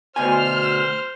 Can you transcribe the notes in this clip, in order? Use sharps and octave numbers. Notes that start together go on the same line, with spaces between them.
D2 B2 C5 G#5 F6